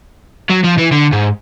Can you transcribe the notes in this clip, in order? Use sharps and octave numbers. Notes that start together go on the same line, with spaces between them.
F#3
F3
E3
D3
G#2